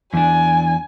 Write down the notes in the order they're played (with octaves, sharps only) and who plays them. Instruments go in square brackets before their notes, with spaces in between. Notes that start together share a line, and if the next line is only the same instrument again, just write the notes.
[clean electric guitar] E2 D4 [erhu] G#5